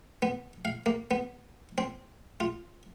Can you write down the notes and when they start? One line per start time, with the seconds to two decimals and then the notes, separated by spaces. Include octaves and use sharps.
0.22 B3
0.65 F5
0.86 A#3
1.11 B3
1.78 C4
2.40 F4